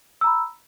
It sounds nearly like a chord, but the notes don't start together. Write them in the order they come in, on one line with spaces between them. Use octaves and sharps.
E6 A#5 B5